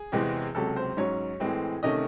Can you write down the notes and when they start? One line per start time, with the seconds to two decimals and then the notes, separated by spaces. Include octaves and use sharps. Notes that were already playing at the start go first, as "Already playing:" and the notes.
Already playing: G#4
0.12 E2 C3 E3 G#3 C4
0.55 C#2 C3 F#3 C#4 A4
0.76 C5
0.97 G#2 F#3 C#4 C#5
1.40 A2 E3 G#3 C4
1.83 C3 D#3 A3 C#4 D#5